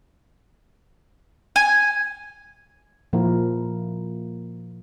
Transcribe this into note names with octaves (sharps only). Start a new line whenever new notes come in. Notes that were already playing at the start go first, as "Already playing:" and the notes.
G#5
A#2 F3 A#3 E4 A#4